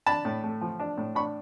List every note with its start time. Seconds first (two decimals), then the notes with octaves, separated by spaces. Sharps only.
0.06 D4 A5 B5
0.25 A2
0.44 A3
0.61 F3
0.80 D4
0.98 A2
1.15 D4 B5 C#6